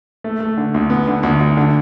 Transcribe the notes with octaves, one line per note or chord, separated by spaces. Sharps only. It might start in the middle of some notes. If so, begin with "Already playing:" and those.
A3
A3
D3
D2
B3
D3
D2
D2
D3